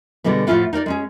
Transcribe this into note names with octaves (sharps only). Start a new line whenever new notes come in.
B2 D3 G3 G#3 B3
A2 F3 C#4 E4 F4 F#5
D#4 A#4 C#5 D5
G#3 C#4 G#4